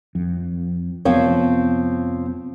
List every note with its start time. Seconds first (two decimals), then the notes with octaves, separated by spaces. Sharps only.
0.15 F2
1.05 F1 F3 B3 C4 C#5